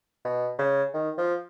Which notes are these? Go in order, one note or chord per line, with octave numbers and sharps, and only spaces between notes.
B2
C#3
D#3
F3